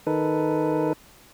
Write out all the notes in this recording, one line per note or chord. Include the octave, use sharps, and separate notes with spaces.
D#3 D#4 A4 B4